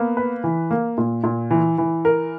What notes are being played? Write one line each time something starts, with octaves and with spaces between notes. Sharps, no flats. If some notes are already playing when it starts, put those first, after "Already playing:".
Already playing: A#3 B3
B4
E3
A#3
A#2
A#2
E3
E3
A#4